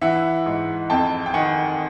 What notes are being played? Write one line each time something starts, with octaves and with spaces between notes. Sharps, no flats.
E3 E5 F#5
G#2
F2 G5 A5
G5
D#3 F#5 G#5